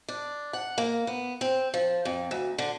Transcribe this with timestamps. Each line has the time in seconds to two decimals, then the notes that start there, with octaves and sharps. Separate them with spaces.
0.08 D4
0.53 F#5
0.78 A#3
1.07 B3
1.41 C4
1.74 F3
2.05 F2
2.31 D2
2.58 D3